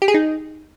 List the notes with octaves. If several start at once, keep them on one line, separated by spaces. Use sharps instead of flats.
G4
G#4
D#4